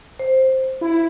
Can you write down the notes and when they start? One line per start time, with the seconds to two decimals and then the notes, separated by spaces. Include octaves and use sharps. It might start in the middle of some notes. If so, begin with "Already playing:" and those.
0.20 C5
0.81 E4